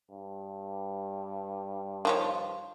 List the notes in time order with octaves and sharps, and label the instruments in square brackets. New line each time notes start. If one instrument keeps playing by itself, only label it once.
[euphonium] G2
[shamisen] D#3 F3 C#5